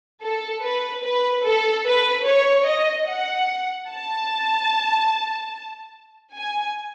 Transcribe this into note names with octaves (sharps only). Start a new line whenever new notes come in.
A4
B4
B4
A4
B4
C#5
D#5
F#5
A5
G#5